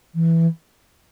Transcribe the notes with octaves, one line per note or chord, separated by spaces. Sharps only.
E3